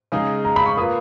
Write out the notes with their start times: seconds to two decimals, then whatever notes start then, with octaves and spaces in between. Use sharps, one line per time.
0.12 C#3 G#3 D#4 G#4
0.45 A#5
0.56 B5
0.66 C#6
0.77 A#3 F4 B4 D#6